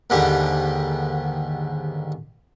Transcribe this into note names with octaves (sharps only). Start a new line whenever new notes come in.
D#2 G#2 D3 G3 G4